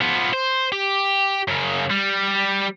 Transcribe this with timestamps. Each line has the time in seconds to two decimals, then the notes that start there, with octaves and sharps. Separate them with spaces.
0.01 F3 B3
0.33 C5
0.72 G4
1.48 F#2 C#3
1.90 G3